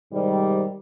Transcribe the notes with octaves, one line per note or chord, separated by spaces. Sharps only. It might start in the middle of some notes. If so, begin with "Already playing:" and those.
G#2 C3 D#3 G3